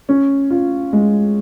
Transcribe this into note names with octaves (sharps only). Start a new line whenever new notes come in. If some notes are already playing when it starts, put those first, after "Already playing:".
C#4
F4
G#3